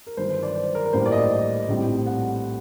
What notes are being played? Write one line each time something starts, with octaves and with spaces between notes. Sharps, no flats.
A#4
G1 G2 D#3 F#3 C5
C5
D5
C5
A#4
A#4
A#1 A2 G3 A#3 C5
D5
D#5
A#1 A2 G3 C4
F#5